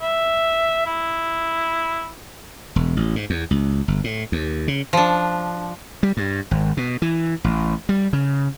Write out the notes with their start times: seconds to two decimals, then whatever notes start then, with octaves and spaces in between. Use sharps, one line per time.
0.01 E5
0.86 E4
2.76 E1
2.97 A1
3.16 G#2
3.30 E2
3.51 C#2
3.88 G1
4.04 A2
4.32 D#2
4.68 C#3
4.93 F3 D4
6.03 G3
6.17 G2
6.51 G#1
6.77 B2
7.02 E3
7.44 A1
7.89 G3
8.13 C#3